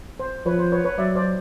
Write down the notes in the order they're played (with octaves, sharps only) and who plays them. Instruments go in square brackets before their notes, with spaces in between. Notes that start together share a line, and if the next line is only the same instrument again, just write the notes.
[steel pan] C5
[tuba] F3 [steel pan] B4 C#5
[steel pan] C5
B4 C#5
B4 C#5
[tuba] F#3 [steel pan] D5 E5
[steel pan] C5 D5